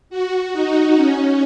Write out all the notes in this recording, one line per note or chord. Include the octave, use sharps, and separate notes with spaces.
F#4
D#4
C#4